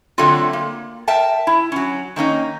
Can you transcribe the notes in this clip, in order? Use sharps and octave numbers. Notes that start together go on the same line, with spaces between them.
D3 F#3 A3 C4 F4
A#3
A#4 E5 G5 A5
E4
F#3 C#4
D#3 A#3 C#4 D#4